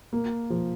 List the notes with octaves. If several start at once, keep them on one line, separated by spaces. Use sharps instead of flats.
A#3
F3